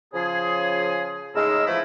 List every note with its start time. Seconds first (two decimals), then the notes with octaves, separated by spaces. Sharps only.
0.13 C#3 F3 G#4
1.34 A2 C#3 G#3 D#4 A#4 E6
1.67 E3 F3 A3 E4